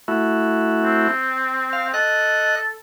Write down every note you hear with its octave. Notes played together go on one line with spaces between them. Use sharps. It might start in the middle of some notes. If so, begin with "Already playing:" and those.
A3 E4 F#4
C4
F5
A4 D#5 F#6